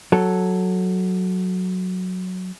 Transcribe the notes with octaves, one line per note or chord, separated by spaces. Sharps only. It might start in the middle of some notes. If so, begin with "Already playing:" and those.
F#3 A4